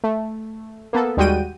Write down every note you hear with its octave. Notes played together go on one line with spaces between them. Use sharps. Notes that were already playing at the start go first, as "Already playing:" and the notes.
A3
A#3 B3 A4
D#2 G3 G#3 F#4 G5 D#7